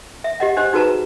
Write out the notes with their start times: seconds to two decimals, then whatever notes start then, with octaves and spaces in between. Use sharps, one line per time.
0.24 E5
0.40 G4 D#5 F#5
0.57 D4 G4 C5 D#5
0.73 D#4 F#4 G#4 B4 A5 A#5